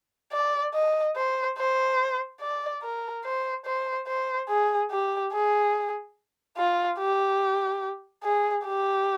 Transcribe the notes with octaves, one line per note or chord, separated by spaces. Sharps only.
D5
D#5
C5
C5
D5
A#4
C5
C5
C5
G#4
G4
G#4
F4
G4
G#4
G4